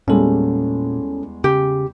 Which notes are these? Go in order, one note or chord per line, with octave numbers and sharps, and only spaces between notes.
E2 A#2 G3 G#3 C#4 A4
C#3 G4